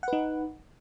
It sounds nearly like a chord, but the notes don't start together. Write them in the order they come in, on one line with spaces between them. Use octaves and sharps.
F#5 B4 D#4